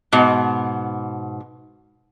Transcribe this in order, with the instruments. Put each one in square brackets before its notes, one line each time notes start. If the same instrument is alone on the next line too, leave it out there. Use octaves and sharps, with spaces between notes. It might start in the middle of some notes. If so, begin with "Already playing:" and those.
[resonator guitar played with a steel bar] G#2 B2